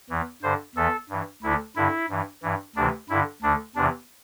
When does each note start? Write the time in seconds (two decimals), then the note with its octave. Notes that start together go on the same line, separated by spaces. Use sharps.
0.10 E2 E3
0.42 G2 D3 C5
0.76 E2 E3 A4
1.10 G2 E3
1.42 D2 D3 E4
1.76 G2 D3 E4
2.09 G2 E3
2.42 G2 E3
2.76 D2 C3 E3 D4
3.09 G2 D3 E4
3.42 D2 D3 D4
3.75 E2 C3 E3 D4